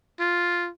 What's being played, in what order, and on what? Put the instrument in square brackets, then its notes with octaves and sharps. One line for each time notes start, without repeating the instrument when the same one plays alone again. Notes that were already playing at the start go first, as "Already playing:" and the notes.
[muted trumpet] F4